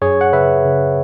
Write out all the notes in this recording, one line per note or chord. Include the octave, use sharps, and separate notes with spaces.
F#2 G#4 C#5
F#5
C#3 B4 E5
C#3